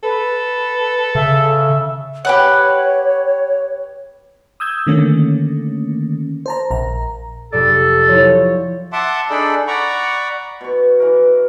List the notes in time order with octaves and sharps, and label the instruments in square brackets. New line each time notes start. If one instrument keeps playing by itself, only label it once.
[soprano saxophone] A4 [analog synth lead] B4
[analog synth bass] C#3 [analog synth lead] E5
[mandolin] G4 B4 F#5 [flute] C#5
[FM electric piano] D#6 E6 G6 G#6
D3 D#3 A3 A#3 C#4
C5 A5 A#5
A#1 A#5
[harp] F1 D5 [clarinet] A4
[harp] F3 E4 [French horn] C#5
[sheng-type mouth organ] E5 F#5 A5 C6 D6
D4 D#4 G#4 A4 D5 B5
D5 F#5 A#5 B5 C#6
[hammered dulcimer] B2 C#6
E3 A#4